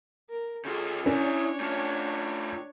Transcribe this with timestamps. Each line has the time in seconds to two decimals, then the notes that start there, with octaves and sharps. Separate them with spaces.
0.30 A#4
0.65 C#3 F4 G#4 A4
1.06 C#4 D4 E4 C#5 D5
1.60 A3 F4